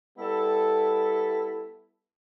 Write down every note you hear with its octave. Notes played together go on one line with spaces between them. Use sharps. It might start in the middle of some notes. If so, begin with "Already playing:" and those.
G3 B3 E4 A4